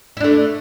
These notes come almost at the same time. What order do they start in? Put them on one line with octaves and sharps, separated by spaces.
E4 D4 A3